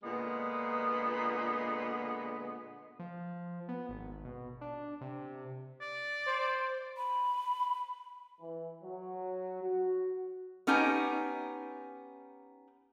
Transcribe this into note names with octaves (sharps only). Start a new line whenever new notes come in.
A#2 D3 G#3 B3
F3
B3
G#1
B2
D4
C3
D5
C5
B5
E3
F#3
F#4
B3 C#4 D#4 G4 G#5 A#5